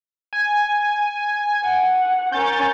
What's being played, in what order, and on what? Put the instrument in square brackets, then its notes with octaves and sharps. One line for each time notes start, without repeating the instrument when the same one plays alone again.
[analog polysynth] G#5
[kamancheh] F#5
[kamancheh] C#4 A#4 [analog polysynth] G6 A6